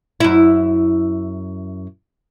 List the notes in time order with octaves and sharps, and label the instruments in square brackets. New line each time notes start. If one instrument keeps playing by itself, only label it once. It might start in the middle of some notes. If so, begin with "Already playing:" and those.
[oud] F#2 E4